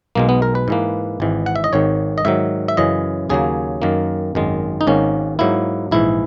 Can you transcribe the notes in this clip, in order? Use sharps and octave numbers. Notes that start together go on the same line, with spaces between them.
B1 B2 G#3 A#3
B3
A#4
B4
G#2 E3 A#3
G#1 G#2 E3
F#5
E5
D#5
G#1 G#2 D#3 C#5
D#5
G#2 D#3 F#3 E5
E5
F#2 C#3 E3 D#5
D#2 C#3 F#3 A#3 G#4
F#2 D#3 A#3
G#1 F#2 D#3 G#3
D#4
G#1 G#2 D#3 A#3 C#4
G#2 F#3 A#3 E4
A#1 G#2 E3 E4